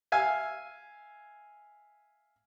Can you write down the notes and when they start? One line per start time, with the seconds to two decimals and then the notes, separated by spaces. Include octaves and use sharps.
0.12 E5 F5 G#5